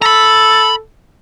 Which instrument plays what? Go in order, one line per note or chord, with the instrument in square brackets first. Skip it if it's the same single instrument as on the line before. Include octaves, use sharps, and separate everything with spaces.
[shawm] A4 [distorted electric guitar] A#5 B5